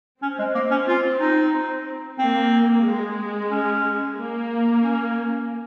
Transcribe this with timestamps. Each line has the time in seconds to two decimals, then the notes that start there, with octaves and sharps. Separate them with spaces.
0.22 C4 C#4
0.39 G#3
0.55 A#3
0.71 C#4
0.88 F4
1.20 D#4
2.19 A#3 C4
2.86 G#3
3.51 C#4
4.17 A#3
4.83 C#4